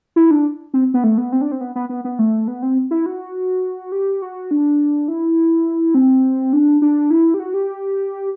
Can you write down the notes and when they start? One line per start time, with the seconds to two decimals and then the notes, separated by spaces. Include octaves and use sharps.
0.16 E4
0.31 D4
0.74 C4
0.94 B3
1.04 A3
1.18 B3
1.32 C4
1.41 D4
1.52 C4
1.61 B3
1.75 B3
1.89 B3
2.05 B3
2.19 A3
2.48 B3
2.62 C4
2.91 E4
3.06 F#4
3.92 G4
4.22 F#4
4.51 D4
5.08 E4
5.94 C4
6.53 D4
6.82 D4
7.10 E4
7.34 G4
7.40 F#4
7.54 G4